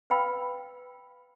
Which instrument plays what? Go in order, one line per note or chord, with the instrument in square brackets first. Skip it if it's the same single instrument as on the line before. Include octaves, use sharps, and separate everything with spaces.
[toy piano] B4 F5 G5 B5 E6